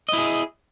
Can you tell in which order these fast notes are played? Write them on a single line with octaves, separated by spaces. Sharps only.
D#5 E4 G#4